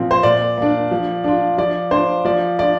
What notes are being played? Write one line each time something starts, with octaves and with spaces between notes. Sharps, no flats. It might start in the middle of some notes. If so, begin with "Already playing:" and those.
Already playing: A#2 F3 C4
C5
A#2 D5
A#3 D4
F3
D4 F4
F3 D5
D4 F4 C5
F3 D5
D4 F4 D5